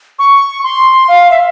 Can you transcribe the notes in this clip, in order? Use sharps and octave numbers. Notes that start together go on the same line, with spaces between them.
C#6
C6
F5
E5